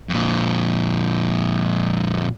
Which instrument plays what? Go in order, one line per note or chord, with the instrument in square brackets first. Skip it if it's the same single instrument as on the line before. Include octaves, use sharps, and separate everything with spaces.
[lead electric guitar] F2 A#2